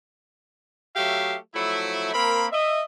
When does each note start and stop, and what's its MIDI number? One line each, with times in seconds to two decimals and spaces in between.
0.96 1.36 54
0.96 1.36 57
0.96 1.36 67
0.96 1.36 76
0.96 1.36 77
1.54 2.14 53
1.54 2.14 54
1.54 2.14 57
1.54 2.14 64
2.14 2.47 58
2.14 2.47 60
2.14 2.47 70
2.14 2.47 83
2.52 2.82 75
2.52 2.82 76